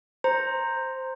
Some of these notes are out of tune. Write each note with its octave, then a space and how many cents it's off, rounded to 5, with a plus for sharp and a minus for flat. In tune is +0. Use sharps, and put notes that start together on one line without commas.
C5 +0 A#5 -5